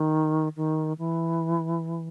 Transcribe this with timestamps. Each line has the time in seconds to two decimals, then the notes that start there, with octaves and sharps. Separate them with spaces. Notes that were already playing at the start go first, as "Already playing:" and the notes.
Already playing: D#3
0.56 D#3
0.98 E3